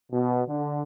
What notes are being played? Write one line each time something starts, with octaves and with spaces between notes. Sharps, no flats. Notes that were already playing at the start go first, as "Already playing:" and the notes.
B2
D3